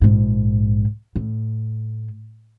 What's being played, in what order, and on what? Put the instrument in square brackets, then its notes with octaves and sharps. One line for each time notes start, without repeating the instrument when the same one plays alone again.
[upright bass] A#1 G#2
A2